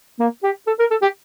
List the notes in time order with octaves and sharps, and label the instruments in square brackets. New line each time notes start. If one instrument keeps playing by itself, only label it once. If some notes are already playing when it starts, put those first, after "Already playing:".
[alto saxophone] A#3
G4
A4
A#4
A4
G4